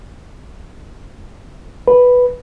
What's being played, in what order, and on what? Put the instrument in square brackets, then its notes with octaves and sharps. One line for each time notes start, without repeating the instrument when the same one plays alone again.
[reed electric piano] B4